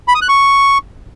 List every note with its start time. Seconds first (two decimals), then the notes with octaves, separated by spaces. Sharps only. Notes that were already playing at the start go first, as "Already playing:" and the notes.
0.08 B5
0.15 D#6
0.22 F#6
0.29 C#6